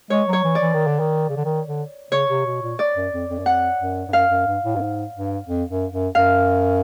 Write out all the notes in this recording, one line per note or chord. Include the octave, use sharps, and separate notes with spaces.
G#3 C#5
F#3
C#5
E3
D5
E3
D#3
D3
D#3
C#3
D3
D#3
D3
C#3 C#5
C3
B2
A#2
D5
F#2
F2
F2
F#2
F2 F#5
F#2
G2
F#2 F5
F#2
G2
A2
G2
G#2
G2
F2
F#2
F#2
F#2 F5